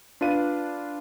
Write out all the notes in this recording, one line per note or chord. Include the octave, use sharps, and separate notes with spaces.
D4 F4 B4 F5 D#7